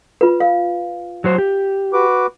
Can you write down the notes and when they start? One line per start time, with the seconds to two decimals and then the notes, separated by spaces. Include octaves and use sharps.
0.21 F4 B4
0.40 F5
1.24 F#3 F#4 C5
1.38 G4
1.93 F#4 B4 D6